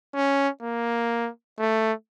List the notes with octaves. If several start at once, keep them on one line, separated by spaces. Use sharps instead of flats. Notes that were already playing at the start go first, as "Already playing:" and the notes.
C#4
A#3
A3